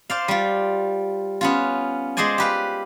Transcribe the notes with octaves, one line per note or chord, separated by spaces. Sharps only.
C5 D5 F5
G3 F4
B3 C#4 F4
G#3 G#4 C5 D5 G#5
G4 B4 F5